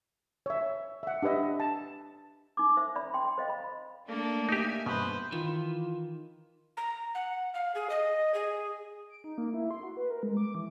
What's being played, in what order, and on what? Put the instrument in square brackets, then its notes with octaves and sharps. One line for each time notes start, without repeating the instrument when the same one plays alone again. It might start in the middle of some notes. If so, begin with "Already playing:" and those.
[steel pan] C#5 E5
E5 F#5
D4 G4 B4 D#5 E5
A5
[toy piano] D#4 D6
C5 E5
D5 E5 B5
G5 C6
C5 D#5 F5
B5
[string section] A3 D4 A4 [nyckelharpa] A#3
[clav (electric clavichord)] D#4 G4 [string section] E5 G#5
[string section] G2 [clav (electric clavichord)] B2 [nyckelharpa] B4 C5
[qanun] D#3 [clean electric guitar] E3 [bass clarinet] F4
[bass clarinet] F4
[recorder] A#5
F#5
F5
G#4
D#5
G#4
[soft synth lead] D7
D#4
A#3
E4
C6
F#4
B4
A#4
G#3
D6
E3